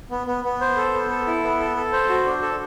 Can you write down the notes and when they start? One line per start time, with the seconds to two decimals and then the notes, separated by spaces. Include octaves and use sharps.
0.11 B3
0.27 B3
0.44 B3
0.61 C5
0.77 A4
0.93 B3
1.10 A4
1.27 E4
1.43 B3
1.60 A4
1.76 A4
1.93 C5
2.09 F#4
2.26 D4
2.42 A4